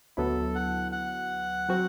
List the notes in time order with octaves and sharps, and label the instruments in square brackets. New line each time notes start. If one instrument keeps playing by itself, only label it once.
[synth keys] D2 D3 F#3 B3 E4 [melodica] A4
[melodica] F#5
F#5
[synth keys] F#3 C4 F#4